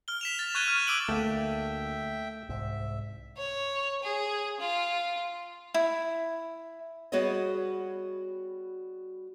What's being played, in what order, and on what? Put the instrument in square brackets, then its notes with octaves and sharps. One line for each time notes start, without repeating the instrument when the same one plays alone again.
[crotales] F6 G7
B6 E7 F7
A6
C#6 F#6 G#6 D#7 G7
F6
D6 E6 D7 F#7
[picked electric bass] D2 A#3 [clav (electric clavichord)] A3 [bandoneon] E5 G5
[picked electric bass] C2 G#2 [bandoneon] E5
[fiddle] C#5
G#4
F4
[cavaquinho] E4
[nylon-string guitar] G3 B3 F#4 G#4 C#5 D#5